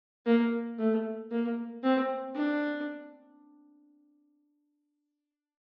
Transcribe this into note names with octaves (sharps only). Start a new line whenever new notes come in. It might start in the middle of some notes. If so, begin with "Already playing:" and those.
A#3
A3
A#3
C4
D4